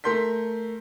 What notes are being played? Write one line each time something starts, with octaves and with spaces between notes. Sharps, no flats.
A3 A#4 C6 G6 B6